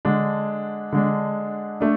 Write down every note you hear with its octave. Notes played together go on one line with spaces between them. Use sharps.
D3 G#3 D4
D3 G#3 D4
A3 D4